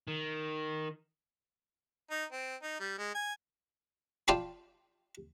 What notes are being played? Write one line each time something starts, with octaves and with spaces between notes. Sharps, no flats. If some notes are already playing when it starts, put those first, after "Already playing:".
D#3
D#4
C4
D#4
G3
G#3
G#5
F4 D5 G5 A5 B5 C6